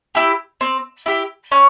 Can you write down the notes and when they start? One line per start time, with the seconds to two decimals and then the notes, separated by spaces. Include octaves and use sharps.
0.15 E4 G4
0.61 C4
1.06 E4 G4
1.52 C#4